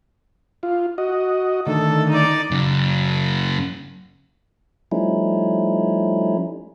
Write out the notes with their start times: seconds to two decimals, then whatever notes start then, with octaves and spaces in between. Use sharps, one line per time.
0.63 F4
0.98 F#4 D#5
1.67 D3 D#3 A3 A4
2.10 D#4 D5
2.51 F#2 C#3
4.92 F3 G3 A3 C#4 D#4 E4